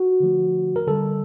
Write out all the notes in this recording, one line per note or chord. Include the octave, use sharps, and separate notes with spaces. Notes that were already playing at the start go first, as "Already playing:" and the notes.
Already playing: F#4
D3 F3 A3
A#4
D3 G3 A4